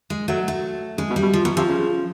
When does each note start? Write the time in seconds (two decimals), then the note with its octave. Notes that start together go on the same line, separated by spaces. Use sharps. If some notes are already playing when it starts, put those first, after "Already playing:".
0.10 G#3
0.28 F#3 A3
0.48 A3
0.98 C#3 G#3
1.10 B2
1.16 G3
1.22 B2
1.33 F3
1.44 B2 F#3
1.57 C3 F3
1.68 C#3